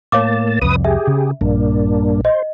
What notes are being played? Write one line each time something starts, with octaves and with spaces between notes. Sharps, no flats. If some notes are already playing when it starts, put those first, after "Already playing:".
A2 A#3 C#5 F5 A5 D6
C2 F2 B4 D#6
G4 G#4 E5
C#3
A#1 G2 A#3 D4
C5 D#5